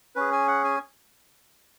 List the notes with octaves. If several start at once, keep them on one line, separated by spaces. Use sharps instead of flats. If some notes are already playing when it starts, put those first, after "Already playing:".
C#4 G#4 B4
G#5
F#5
G#5